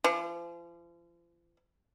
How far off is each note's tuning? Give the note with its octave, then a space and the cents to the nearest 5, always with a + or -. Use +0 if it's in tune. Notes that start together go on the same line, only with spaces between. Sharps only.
F3 -40